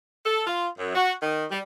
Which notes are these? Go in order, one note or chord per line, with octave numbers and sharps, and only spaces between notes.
A4
F4
F#2
F#4
D#3
G3